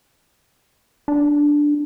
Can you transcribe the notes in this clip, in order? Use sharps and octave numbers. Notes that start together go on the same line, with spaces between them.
D4